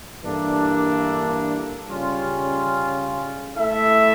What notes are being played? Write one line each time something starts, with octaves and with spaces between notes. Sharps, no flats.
G2 E3 A#3 D4 A4
C#3 G3 C#4 F4
A3 E4 A4 E5